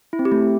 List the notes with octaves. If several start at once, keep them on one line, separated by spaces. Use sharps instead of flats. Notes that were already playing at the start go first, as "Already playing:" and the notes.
E4
C4
G4
A3